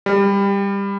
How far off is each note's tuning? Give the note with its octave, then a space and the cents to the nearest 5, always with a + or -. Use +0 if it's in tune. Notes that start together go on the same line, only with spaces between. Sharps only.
G3 +20